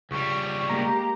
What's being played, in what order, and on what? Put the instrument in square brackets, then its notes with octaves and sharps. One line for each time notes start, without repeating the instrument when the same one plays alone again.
[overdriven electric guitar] C#2 G3 [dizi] C#6
[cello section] G#3 A#3 G4 [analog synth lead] A#5